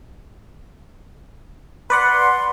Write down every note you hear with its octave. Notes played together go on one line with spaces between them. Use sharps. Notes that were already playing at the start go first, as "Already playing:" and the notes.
B4 D5 F#5 C6